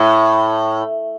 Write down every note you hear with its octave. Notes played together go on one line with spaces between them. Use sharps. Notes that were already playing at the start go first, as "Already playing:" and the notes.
Already playing: A2